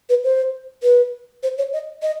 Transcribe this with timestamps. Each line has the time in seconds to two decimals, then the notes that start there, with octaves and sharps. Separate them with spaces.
0.09 B4
0.24 C5
0.83 B4
1.43 C5
1.58 C#5
1.73 D#5
2.02 D#5